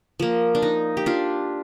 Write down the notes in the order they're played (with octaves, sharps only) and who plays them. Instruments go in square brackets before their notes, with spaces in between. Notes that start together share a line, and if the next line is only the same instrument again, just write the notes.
[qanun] F3 A#3
D4
D#4
G4
D4 F4